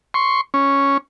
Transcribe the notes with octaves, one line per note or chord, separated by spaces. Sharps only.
C6 C#6
C#4